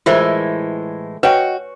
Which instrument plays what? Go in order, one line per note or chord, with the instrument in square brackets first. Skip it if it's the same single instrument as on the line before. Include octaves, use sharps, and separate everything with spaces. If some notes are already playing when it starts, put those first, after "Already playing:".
[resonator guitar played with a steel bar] A2 E3 G#3 [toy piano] F4 C5 E5 [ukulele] A#4
[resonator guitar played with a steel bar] F#4 [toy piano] B4 C#5 G#5 [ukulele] D#5 G5